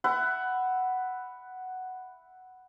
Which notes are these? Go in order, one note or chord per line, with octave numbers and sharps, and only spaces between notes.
E5 F#5 B5